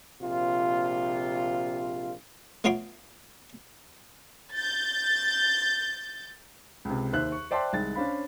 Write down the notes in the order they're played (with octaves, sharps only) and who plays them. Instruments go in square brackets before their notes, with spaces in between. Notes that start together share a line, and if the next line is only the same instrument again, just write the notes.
[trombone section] A#1 C3 F4
[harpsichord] A3 B3 F4 C#5 C6 D6
[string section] G6 A6
[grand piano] C#2 C3
D#2 D#3 C5 E5 F#6
C#6
C5 D5 E5 G5 A5 C6
C2 D#3 G#3 A6
C#4 D4 C5 F5 B5